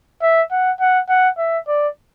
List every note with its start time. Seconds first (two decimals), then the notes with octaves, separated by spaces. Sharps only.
0.22 E5
0.51 F#5
0.80 F#5
1.09 F#5
1.38 E5
1.68 D5